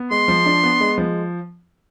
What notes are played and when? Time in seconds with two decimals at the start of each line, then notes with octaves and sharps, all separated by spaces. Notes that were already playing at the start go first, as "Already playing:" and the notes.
Already playing: B3
0.11 G#3 C6
0.28 F3
0.46 D4
0.63 B3
0.80 G#3
0.98 F3